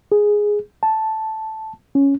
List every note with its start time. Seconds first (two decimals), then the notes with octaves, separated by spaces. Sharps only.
0.12 G#4
0.83 A5
1.95 C#4